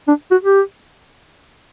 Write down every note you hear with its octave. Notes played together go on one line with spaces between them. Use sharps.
D4
F#4
G4